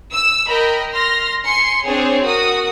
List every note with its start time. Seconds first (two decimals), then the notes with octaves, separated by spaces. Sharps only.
0.12 E6
0.48 A#4 D#5 G5 B5
0.93 C6 F6 A#6
1.43 G#5 C6 C#7
1.84 C4 D4 G#4 C#5
2.23 F#4 A#4 D#6